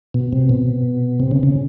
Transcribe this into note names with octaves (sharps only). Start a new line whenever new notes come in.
B2
C3
B2
C3
C#3
C#3